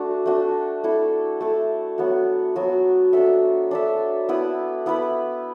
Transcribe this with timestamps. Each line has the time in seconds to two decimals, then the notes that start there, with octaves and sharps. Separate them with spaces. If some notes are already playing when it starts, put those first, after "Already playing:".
Already playing: A3 D4 F#4
0.26 A3 D4 F#4
0.84 A3 E4 A4
1.40 A3 E4 A4
1.98 F#3 B3 F#4
2.56 F#3 B3 F#4
3.13 D4 A4 E5
3.71 D4 A4 E5
4.29 B3 E4 B4
4.86 B3 E4 B4